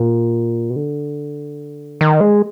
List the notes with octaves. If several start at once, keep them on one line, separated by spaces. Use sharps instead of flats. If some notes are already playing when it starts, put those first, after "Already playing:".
Already playing: A#2
B2
D3
D#3
G#3